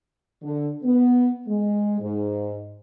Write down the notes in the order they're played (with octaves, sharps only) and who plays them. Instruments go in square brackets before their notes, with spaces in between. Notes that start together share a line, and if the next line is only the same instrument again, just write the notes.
[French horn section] D3
B3
G#3
G#2